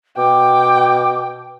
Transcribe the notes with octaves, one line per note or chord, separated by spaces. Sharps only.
B2 G5 D6